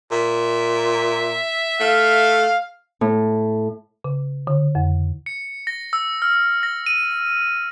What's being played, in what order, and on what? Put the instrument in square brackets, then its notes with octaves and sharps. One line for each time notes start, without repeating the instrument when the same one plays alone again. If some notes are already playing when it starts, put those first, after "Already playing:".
[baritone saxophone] A#2 [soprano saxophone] E5
[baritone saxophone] A3 [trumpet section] F5
[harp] A2
[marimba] C#3
D3
F2
[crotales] C#7
A#6
E6
F6
A#6
D#7